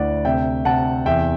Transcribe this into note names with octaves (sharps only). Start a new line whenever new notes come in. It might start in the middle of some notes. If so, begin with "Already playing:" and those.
Already playing: D2 D3 E4 D5 F#5
C3 E5 G5
C3 F#5 A5
E2 E5 G5